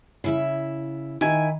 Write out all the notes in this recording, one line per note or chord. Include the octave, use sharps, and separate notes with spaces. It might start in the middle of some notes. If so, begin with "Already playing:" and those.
C#3 E4 E5
D#3 E4 G#5